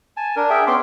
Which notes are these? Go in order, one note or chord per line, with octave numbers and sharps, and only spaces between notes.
G#5 A5
D4 A#4
G#4 E5 G5
B3 C#4 C6 D6